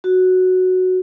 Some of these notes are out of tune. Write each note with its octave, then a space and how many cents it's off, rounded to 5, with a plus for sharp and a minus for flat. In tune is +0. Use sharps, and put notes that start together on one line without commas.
F#4 +0